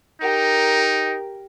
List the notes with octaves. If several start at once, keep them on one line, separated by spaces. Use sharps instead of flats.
D#4 G4 A#4